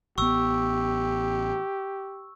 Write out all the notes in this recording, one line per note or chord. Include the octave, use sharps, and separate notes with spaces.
A1 B3 G4 C#6 E6